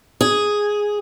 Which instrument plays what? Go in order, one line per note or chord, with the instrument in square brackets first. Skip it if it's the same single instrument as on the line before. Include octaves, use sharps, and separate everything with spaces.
[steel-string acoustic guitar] G#4